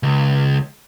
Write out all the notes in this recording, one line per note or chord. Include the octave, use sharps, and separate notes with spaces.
C#2